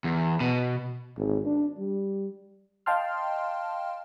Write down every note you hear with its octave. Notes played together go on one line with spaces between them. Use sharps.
E2
B2
G#1
D4
G3
D#5 F5 G5 A5 C6 F6